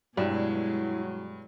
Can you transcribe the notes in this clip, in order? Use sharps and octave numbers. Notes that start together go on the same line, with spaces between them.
G2 B2 F#3 G#3 E4 D5